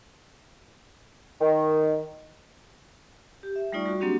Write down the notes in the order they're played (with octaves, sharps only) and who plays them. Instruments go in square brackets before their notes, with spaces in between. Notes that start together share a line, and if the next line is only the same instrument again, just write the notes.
[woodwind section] D#3
[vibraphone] G4
E5
G3 A3 D#4 F4 D5 C#6
G3 F#4
F#3 A#3 C4 D4 F#4 G4